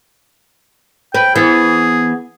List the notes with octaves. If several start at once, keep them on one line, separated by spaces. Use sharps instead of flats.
B4 G5
E3 B3 G#4